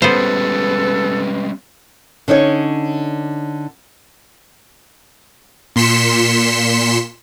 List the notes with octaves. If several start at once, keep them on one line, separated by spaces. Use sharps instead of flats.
G3 G#3 B3 C#4 A4 B4 C5
D3 C#4 D#4 C#5
A#2 C6 B6 C#7 E7